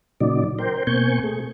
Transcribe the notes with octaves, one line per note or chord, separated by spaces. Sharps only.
A#2 C#3 F#3 D#4 D5
A#4 C5 G5
B2 A#3 C4 G#5 C#6 G6
A3 G#4